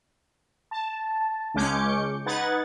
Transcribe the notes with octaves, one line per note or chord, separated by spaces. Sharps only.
A5
C#2 G#3 C#4 D6 G6 C#7
D#4 B4 F#5 G#6 A6